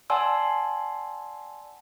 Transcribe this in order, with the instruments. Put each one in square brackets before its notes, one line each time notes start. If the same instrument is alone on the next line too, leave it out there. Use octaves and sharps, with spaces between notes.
[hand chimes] D5 F#5 G#5 A5 C6 E6